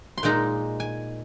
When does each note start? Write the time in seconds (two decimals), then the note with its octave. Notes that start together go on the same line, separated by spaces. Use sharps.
0.18 C6
0.23 A#2 G#3 D#4 A#5
0.80 G#5